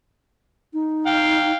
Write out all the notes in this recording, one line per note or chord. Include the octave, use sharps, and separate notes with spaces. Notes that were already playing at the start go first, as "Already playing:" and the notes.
D#4
F5 G5